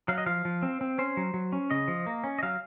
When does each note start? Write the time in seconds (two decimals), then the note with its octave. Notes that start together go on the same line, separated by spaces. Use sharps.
0.08 F#3 F5
0.18 D#5
0.26 F3 F5
0.45 F3
0.62 C4
0.81 C4
0.98 C#4 C5
1.17 F#3
1.34 F#3
1.53 C#4
1.71 C#3 D#5
1.88 F3
2.07 A#3
2.24 C#4
2.39 D#5
2.43 F#3 F5